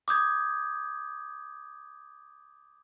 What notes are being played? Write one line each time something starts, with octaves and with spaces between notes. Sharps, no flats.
D6 D#6 G6 G#6